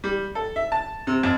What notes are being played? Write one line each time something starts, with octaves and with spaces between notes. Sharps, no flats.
G3
A4
E5
A5
C3
F2